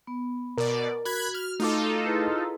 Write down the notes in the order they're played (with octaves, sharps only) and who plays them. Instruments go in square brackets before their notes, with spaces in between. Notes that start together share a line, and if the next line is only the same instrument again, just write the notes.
[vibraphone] B3
[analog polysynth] B2 D5 [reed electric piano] A#4
[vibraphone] F#4 [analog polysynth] B5 F#6 G#6
[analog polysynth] F6
[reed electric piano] A3 D6 [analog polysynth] D#4 F4 A4
[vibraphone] E4 G#4 B4